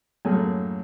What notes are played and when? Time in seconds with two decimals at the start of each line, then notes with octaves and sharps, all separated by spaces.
0.25 F#2 A2 A#3 G#4 A4